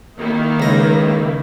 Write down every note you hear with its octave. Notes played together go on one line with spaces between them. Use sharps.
D#3 A#3 E4
C#2 D#5